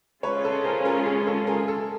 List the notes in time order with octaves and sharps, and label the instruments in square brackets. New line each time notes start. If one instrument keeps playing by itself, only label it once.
[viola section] G#3 C#4 F4 [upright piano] B4 C#5
[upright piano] A4 B4
A#4 C5
G#4 A#4
G#4
A4
G#4 A#4
A4